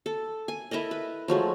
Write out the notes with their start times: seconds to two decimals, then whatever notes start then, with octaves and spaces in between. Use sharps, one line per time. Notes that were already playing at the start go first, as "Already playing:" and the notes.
0.06 A4
0.48 G#5
0.71 E4 A4 A#4 D#5
0.91 B4
1.28 F3 F#3 G#3 A3